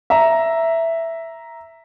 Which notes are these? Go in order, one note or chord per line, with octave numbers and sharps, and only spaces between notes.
E5 A#5